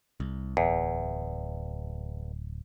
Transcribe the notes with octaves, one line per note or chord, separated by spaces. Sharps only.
C2
D1 E2